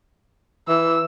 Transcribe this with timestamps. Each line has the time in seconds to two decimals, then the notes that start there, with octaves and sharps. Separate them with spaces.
0.68 E3 E6